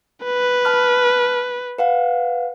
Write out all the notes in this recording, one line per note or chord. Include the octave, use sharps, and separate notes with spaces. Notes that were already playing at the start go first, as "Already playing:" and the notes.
B4
A5 B5 F6
B4 F5 F#5